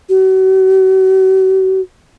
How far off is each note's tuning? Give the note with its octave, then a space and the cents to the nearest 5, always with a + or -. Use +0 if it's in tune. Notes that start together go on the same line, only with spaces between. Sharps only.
F#4 +45